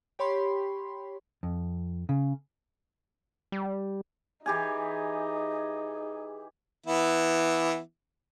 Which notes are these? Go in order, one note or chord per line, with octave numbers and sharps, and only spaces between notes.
G4 C#5 B5 C6
F2
C#3
G3
E3 D#4 G4 G#4 G#5
E3 B3 E4